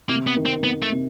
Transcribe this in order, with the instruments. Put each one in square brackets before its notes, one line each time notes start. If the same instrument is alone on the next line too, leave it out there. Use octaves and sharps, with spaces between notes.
[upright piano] C3 [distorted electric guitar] A#3
[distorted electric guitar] B3
[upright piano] D#3
[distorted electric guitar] C4
[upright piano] D#3 [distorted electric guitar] B3
[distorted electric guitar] A3
[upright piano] C3